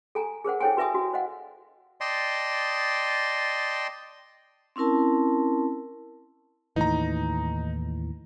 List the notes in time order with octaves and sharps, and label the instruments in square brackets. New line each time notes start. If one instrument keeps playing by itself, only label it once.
[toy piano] A4 G#5 A#5
G#4 A#4 C5 F#5
E4 A4 C5 C#5 G5 G#5
F#4 B4 E5 G#5 D#6
F#4
C5 D#5 F5 F#5
[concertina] D5 D#5 G5 A5 C6
[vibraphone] C4 C#4 E4 A#4 A5
[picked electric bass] D#2 A2 E3 [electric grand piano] D#4 A#5